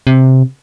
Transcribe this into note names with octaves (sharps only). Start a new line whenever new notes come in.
C3